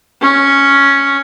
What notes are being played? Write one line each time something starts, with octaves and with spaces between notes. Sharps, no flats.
C#4